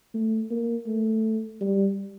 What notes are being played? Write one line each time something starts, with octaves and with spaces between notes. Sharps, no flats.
A3
A#3
A3
G3